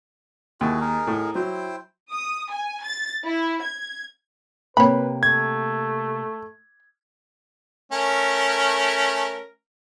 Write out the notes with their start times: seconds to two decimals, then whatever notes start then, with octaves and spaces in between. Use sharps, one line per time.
0.61 D#2 E4 F#4 G#4
0.81 D#4 G#4 A#4
1.07 A2
1.35 F#3 E4 C5 G5
2.13 D#6
2.51 G#5
2.84 A6
3.26 E4
3.63 G#6
4.77 C3 A#3 B4 C#5 G5 B5
5.23 A3 G#6
7.92 A3 C#4 A#4